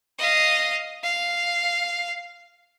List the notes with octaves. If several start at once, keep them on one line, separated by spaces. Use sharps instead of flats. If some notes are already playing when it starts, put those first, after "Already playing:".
D#5 F5
F5